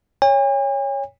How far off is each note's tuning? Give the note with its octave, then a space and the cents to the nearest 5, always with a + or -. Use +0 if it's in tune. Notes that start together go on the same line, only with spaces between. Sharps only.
C#5 +0 G#5 -45